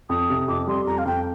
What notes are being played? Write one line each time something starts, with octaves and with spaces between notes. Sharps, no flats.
F2 D#6
C3
F2 D6
G3 C6
F2 A#5
F5
F2 G5